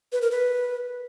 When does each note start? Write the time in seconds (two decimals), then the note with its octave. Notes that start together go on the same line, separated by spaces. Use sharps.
0.12 B4
0.22 A#4
0.31 B4